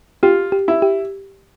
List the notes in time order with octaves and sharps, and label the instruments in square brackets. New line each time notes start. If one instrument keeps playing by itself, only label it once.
[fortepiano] F4 [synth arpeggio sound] G4
[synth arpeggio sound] G4
[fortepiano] E4
[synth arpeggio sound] G4